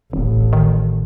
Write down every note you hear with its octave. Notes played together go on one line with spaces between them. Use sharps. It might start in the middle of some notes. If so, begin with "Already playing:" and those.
D#1 A1
D#3